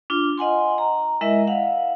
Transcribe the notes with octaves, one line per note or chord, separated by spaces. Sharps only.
D4 F4
D#5 F#5 G#5 C6
A#5
G#3 E4 A#4 D#5 E5
F5 F#5